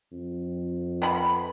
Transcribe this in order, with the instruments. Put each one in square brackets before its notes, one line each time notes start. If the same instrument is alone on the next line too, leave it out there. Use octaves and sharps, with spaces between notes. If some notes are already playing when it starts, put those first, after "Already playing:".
[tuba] F2
[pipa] B3 B5